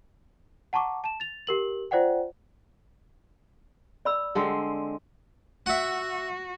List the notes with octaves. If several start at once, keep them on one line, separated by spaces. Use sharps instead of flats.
F#5 A5 A#5 C#6 D6
A5 E7
A6 F7
G4 A#4 F#7
F4 C5 D5 F#5 G5
D5 B5 E6
D3 G#3 C4
F#4 E5 F#5